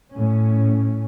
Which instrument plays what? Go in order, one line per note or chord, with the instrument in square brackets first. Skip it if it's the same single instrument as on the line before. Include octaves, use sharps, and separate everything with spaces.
[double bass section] A2 C#4